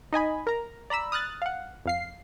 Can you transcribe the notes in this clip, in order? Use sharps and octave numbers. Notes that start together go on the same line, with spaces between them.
D#4 D#5 G#5 B5
A#4 A#5
D5 A#5 B5 E6
D#6 F6 F#6 A6
F5 F#5
F2 F5 C7